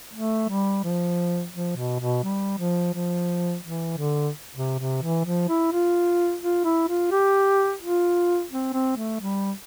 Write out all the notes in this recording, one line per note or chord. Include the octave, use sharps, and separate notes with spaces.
A3
G3
F3
F3
B2
B2
G3
F3
F3
E3
D3
C3
C3
E3
F3
E4
F4
F4
E4
F4
G4
F4
C4
C4
A3
G3